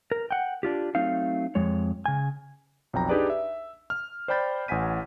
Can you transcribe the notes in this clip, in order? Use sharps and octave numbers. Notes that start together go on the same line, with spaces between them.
A#4
F#5 G5
D4 F4 G4
F#3 A3 C4 D#4 F5
F2 G#3 C#5
C#3 G#5
B1 F2 G5 A#5
D4 D#4 G4 G#4 B4 D5
E5
F6
C5 D5 G5 B5 G6 A6
A1 F#5 G#5 B6 D#7